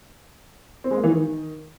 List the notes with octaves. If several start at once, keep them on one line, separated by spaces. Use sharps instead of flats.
C4
G#3
A#3
E3
D#3